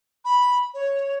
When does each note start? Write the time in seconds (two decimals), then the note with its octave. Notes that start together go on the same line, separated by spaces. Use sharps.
0.25 B5
0.74 C#5